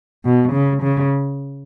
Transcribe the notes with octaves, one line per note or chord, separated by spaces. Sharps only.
B2
C#3
C#3